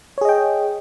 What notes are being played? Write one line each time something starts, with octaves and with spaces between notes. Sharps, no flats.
G#4 C#5 D#5 G5